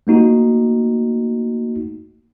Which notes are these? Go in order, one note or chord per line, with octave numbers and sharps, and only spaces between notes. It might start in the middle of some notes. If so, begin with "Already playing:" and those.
A3 A#3 D#4 F#4